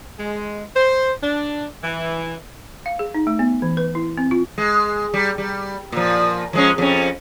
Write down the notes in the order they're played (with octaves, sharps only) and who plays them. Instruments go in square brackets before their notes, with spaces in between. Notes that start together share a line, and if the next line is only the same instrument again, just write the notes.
[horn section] G#3
C5
D4
E3
[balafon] F5
G#4
D#4
A3
B3
E3
B4
E4
C4
F4
[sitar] G#3
G3
G3
A#2 F3
F3 G#3 C#4
F2 C#4